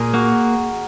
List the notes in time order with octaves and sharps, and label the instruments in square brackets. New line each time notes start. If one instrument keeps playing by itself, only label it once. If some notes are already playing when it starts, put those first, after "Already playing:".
Already playing: [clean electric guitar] A#2 [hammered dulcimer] G#4 A#4
[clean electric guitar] A#3 [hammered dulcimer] F#4